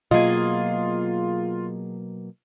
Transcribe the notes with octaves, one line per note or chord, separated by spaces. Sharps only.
B2 F#3 A#3 F4 G#4 D#5